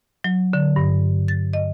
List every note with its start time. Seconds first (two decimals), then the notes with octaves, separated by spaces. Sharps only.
0.24 F#3
0.53 D3
0.76 G2
1.28 A6
1.53 D#5